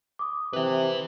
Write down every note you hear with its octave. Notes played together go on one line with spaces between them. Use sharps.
D6 D#6
C3 B4 E5